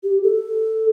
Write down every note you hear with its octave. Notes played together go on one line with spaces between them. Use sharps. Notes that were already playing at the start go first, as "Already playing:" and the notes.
G4
A4